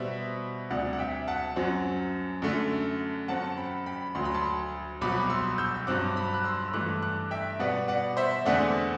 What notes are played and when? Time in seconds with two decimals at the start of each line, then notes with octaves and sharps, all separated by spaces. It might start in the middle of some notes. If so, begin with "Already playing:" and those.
Already playing: B2 G3 B3 C5 E5
0.70 D2 C3 G3 D5 F#5
0.93 F#5
0.99 E5 G5
1.28 F#5 A5
1.56 F#2 F#3 C4
2.42 F#2 D3 A3
3.28 F#2 F#3 C4 F#5 A5
3.57 G5 B5
3.86 G5 B5
4.15 D2 D3 F#3 C6
4.25 B5
4.34 A5 C6
5.01 C2 B2 F#3 B5 D6
5.30 C6 E6
5.58 E6 G6
5.87 G2 F#3 C4 D6 F#6
6.16 B5 D6
6.34 F#6
6.44 C6 E6
6.68 E6
6.73 G2 E3 A3 D6 F#6
7.02 D6 F#6
7.31 E5 G5
7.59 B2 G3 B3 D5 F#5
7.88 D5 F#5
8.17 C5 E5
8.45 E2 D3 A3 C4 D5 F#5